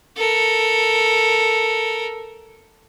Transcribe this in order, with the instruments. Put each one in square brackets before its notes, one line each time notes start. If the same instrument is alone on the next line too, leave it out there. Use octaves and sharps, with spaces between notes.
[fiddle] A4 A#4